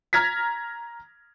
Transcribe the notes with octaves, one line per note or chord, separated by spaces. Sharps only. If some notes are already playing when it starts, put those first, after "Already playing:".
A#5 F6 G#6 A#6 B6